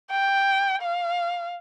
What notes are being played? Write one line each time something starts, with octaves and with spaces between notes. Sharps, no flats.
G5
F5